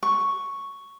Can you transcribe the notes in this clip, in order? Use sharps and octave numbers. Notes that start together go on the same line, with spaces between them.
C#6